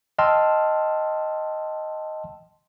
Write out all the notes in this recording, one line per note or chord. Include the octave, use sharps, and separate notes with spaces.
D#5 G5 A5 C6 E6 F6